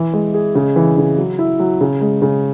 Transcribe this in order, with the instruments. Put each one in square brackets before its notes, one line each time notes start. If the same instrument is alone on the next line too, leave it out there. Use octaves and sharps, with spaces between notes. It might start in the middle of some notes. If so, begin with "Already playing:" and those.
Already playing: [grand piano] E3
G#3
G#4
C#3
E3
C#3
F#3
E4
F#3
C#3
G#3
C#3